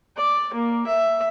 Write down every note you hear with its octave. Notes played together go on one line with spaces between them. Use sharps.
D5
A#3
E5